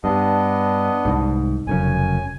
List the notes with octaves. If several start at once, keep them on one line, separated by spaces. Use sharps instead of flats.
G2 B3 D4 D#5
C2 G#2
F1 F#2 C#3 G#5